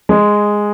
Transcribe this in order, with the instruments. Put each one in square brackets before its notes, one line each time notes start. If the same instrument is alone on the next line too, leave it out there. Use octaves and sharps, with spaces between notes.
[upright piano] G#3